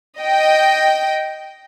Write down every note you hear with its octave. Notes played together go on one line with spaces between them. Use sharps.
D#5 G5